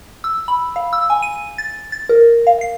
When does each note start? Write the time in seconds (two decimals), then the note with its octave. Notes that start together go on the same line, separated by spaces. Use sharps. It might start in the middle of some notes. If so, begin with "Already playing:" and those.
0.24 E6
0.48 B5
0.76 F5
0.93 E6
1.10 G#5
1.23 D#7
1.58 A6
1.92 A6
2.09 A#4
2.47 F5
2.61 C7